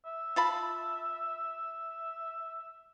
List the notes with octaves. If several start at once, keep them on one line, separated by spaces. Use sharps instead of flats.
E5
F4 A5 B5